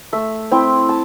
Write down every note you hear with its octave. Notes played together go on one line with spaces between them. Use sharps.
A3 E5
C4 E4 G5
A5